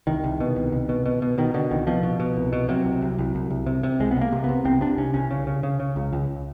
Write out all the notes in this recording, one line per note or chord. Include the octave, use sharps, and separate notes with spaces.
C2 D#3
C2
B2
C2
C2
B2
B2
B2
B2 D#3
B2 D3
C2 D#3
B2 F3
B2
B2
C2
B2
C3 F#3
C2
C2
C2
C2
C2
C3
C3
C2 G#3
B3
C2
A#3
C3
C3 B3
C2 C4
C3 D4
C2 C#4
C2 C#4
C#3
C#3
C#3
C#3
C#2
C#2